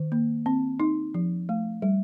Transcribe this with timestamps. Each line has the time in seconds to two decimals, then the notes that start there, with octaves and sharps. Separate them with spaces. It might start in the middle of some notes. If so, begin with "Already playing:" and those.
Already playing: D#3
0.12 A#3
0.46 C4
0.80 D#4
1.14 F3
1.49 A3
1.82 G3